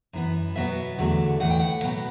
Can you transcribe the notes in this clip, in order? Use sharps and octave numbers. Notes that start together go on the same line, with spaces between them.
F#2 E3 B3
B2 F#3 B3 E5
E2 D3 F#3 A3
A2 E3 A3 F#5
G5
F#5
B2 F#3 B3